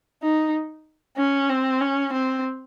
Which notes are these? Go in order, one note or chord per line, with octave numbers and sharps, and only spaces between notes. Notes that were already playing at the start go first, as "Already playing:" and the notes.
D#4
C#4
C4
C#4
C4